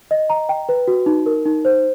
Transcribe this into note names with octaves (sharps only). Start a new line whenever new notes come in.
D#5
A#5
G5
B4
F#4
D#4
A#4
D#4
C5